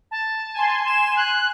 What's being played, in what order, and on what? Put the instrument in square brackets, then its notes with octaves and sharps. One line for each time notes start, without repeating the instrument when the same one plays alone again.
[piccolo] A5
[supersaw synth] G#5 C6
[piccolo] E7
F#6